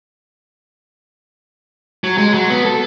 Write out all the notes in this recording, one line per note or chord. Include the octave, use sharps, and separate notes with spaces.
F#3
G#3
F#3
B3
A4